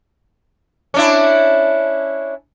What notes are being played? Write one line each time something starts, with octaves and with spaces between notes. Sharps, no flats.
C#4 D4 E4